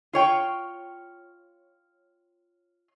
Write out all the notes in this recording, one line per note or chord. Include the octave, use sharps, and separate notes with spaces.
F4 C#5 G5